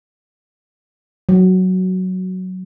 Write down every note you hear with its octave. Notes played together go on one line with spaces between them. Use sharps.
F#3